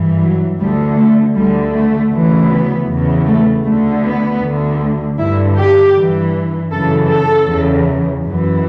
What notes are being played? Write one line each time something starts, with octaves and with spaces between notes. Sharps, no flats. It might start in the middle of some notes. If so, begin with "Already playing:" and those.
Already playing: G2 E3
F#3
D2 D3 G3
A3
D2 D3 G3
A3
D2 C#3 E3
B3
E2 C#3 E3
A3
D2 D3 A3
B3
D2 D3
G2 D3 E4
G4
G2 E3
F#2 C#3 E3 A4
A4
E2 C#3 E3
F#2 E3